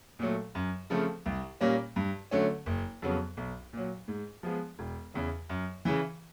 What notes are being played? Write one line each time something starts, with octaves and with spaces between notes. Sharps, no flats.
A#2 F#3 A3
F#2
C#3 F3 A3 C4
C2
A#2 G3 A#3 C#4
G2
D3 F#3 A3 C#4
F#1
F2 C#3 F#3 B3
B1
A#2 F#3
G#2
F3 G#3 B3
E1
E2 C#3
F#2
C#3 E3